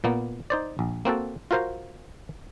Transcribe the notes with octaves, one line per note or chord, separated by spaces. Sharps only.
A#2 A#3 B3
D#4 C5 D5
A#1
A#3 C4 F#4 A4
F4 F#4 A#4 C5 F5